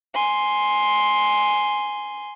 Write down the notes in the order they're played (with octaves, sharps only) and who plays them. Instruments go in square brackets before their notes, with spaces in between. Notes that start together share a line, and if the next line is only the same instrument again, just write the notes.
[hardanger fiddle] G#5 C6